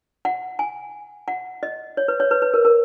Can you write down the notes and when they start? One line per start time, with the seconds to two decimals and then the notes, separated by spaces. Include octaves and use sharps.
0.25 F#5
0.59 G#5
1.28 F#5
1.63 D#5
1.97 C#5
2.08 B4
2.20 C#5
2.31 B4
2.42 B4
2.54 A#4
2.65 A#4